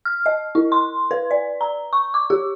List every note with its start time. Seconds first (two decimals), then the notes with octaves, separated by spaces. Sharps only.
0.05 F6
0.26 D#5
0.55 E4
0.72 C6
1.11 B4
1.31 D5
1.61 A#5
1.93 C#6
2.14 D6
2.30 G4